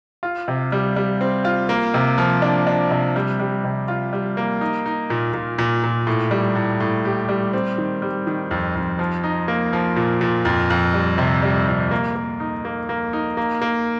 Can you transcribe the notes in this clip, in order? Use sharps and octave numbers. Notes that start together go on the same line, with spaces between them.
F4
C3
G3
G3
C4
F4
A#3
C3
F3
D4
D4
C3
G3
G3
C3
F4
G3
A#3
D#4
D#4
A#2
A#2
A#2
A#2
A2
G3
A2
A2
G4
G3
C4
D#3
G3
D#3
F2
F2
F3
D#4
A#3
F3
A#2
A#2
F2
F2
G3
C3
G3
F2
A#3
A#3
D#4
A#3
A#3
D#4
A#3
A#3